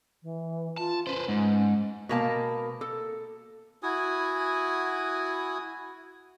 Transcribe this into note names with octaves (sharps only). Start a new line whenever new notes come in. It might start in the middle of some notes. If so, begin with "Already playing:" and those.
E3
F4 A5
C#4 B4 C5
G#2
B2 A#3 A5
A4
E4 F#4 G#5 D#6